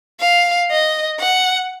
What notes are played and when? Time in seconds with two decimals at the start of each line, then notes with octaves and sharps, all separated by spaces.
0.20 F5
0.71 D#5
1.20 F#5